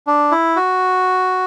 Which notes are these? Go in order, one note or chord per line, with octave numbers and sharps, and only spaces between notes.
D4
E4
F#4